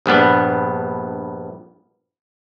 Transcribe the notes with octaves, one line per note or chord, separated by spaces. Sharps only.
A#1 G2 B3 D4